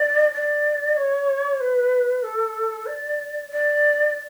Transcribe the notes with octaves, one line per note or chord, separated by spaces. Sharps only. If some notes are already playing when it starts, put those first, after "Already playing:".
Already playing: D5
D5
C#5
B4
A4
D5
D5